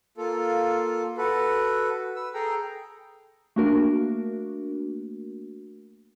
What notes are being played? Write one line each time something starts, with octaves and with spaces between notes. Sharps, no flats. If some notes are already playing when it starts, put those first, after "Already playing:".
A#3 F4 A4
F#4 A4 B4
B4 E6
G#4 A4 G5 A#5
A3 A#3 D4 F#4 A#4